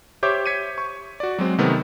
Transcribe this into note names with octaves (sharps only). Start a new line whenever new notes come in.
G4 C5 C#5 E5 D6 G6
G#6 B6 C#7 D#7
C#6
F#4 D5
F#3 G#3 C4
C3 D#3 A3 B3